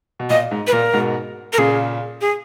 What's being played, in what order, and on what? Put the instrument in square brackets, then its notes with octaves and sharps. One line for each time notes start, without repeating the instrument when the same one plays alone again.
[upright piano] B2
[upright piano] A#2 [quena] D#5
[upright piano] G#2
[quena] B4
[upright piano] A#2 [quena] A#4
[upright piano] G#2 B2
[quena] A#4
[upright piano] A#2 C#3 [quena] G#4
[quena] G#4